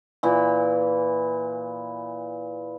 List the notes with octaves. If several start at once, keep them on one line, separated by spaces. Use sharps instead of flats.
A#2 E3